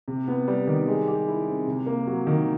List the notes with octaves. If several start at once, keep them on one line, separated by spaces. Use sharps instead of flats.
C3
B3
G3
D#3
G#3
G4
E4
C4
C3
A#3
F#3
D#3